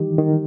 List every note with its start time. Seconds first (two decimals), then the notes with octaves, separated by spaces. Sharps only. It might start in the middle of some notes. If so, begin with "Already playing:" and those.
Already playing: D#3 E3 G3 D#4 G4
0.18 D#3